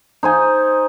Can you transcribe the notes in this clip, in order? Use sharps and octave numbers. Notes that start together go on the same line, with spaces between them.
D#4 C5 G#5